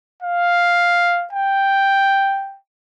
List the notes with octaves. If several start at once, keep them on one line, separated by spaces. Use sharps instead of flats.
F5
G5